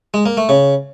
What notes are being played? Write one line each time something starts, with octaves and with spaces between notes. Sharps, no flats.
G#3
A#3
A3
C#3